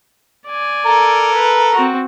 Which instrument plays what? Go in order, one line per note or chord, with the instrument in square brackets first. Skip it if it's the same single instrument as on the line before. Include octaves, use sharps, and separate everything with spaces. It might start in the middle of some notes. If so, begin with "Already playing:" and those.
[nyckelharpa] D5 G#5
[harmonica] A4 A#4 A#5
[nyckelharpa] B4
C4 F#4